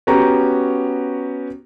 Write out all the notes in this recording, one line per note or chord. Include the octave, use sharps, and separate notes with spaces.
B3 C#4 F#4 G4 A#5